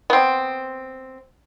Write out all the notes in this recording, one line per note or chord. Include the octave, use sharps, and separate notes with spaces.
B3 C4